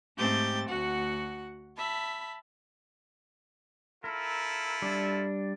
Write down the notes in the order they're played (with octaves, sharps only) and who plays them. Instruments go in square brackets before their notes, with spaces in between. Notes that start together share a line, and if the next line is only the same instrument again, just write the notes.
[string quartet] G#2 A3 C4 G4 G6 A6
D2 F#4 F#5
E5 A5 B5
[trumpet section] E4 F4 A4 [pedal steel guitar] A#4
[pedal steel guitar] G3 D4